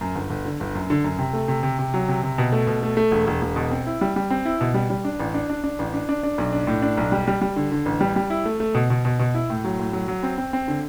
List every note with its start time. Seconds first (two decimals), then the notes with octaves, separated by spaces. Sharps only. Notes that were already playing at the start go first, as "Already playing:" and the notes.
0.01 F#2
0.15 G1
0.30 G1
0.46 D3
0.60 G1
0.75 F#2
0.90 D3
1.04 F#2
1.18 C3
1.33 A3
1.48 C3
1.63 C3
1.79 C3
1.94 F#3
2.08 C3
2.23 C3
2.38 B2
2.52 A3
2.67 B2
2.83 A3
2.97 A3
3.12 E1
3.27 E1
3.42 E1
3.56 B2
3.71 C4
3.87 E4
4.01 G3
4.16 G3
4.30 C4
4.45 E4
4.61 B2
4.74 G3
4.90 G3
5.05 D4
5.20 A1
5.34 D4
5.50 D4
5.64 D4
5.79 A1
5.94 D4
6.09 D4
6.23 D4
6.38 B1
6.53 D4
6.67 A2
6.82 D4
6.97 B1
7.12 G3
7.28 G3
7.41 G3
7.56 D3
7.72 D3
7.86 A1
8.01 G3
8.16 G3
8.30 E4
8.45 A3
8.60 A3
8.75 B2
8.90 B2
9.05 B2
9.19 B2
9.35 E4
9.50 A2
9.64 F#3
9.80 A2
9.93 F#3
10.08 F#3
10.23 C4
10.38 C4
10.53 C4
10.68 D3